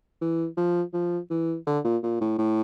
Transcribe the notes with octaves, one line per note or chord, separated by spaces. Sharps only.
E3
F3
F3
E3
D3
A#2
A#2
A2
A2